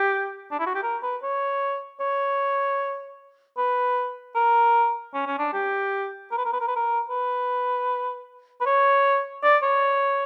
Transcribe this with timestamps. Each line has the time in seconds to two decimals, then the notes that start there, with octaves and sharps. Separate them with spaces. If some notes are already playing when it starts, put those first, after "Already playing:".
Already playing: G4
0.52 D4
0.60 E4
0.67 F#4
0.75 G4
0.83 A#4
1.03 B4
1.23 C#5
2.00 C#5
3.58 B4
4.35 A#4
5.14 C#4
5.27 C#4
5.39 D4
5.53 G4
6.31 A#4
6.38 B4
6.45 A#4
6.53 B4
6.60 A#4
6.68 B4
6.76 A#4
7.10 B4
8.61 B4
8.66 C#5
9.44 D5
9.63 C#5